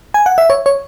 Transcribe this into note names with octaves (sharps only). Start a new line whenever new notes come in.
G#5
F#5
E5
C#5
C#5